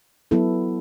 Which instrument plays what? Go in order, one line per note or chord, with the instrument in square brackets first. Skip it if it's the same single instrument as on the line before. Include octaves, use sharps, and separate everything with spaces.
[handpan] F#3 B3 E4 A4